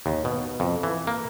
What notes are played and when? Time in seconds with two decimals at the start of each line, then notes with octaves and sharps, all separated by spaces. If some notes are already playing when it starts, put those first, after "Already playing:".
0.06 D#2
0.25 B2
0.60 F2
0.83 E3
1.07 A#3